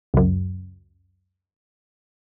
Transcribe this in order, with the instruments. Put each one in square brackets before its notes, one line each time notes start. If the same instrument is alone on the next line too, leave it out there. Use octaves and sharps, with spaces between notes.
[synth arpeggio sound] C#2 F#2